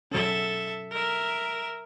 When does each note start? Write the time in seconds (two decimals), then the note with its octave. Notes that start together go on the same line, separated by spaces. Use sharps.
0.12 F#3 C#4 A4 E5
0.91 A#4 E5